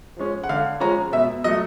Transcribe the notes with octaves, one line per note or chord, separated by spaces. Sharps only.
F3 G#3 C#4
F#5
D3 F5
F3 G#3 C#4 A#5
B2 E5
F#3 A3 D#5